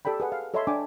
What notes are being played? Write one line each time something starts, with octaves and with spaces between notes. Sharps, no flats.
G4 A4 D5 G5 B5
G#4 B4 F#5
F5
A4 C#5 D#5 E5 B5 C6
D4 G5 G#5 D6